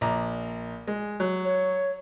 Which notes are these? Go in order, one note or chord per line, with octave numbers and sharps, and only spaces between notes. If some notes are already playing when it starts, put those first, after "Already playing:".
A#1 D5 A#5
G#3
F#3
C#5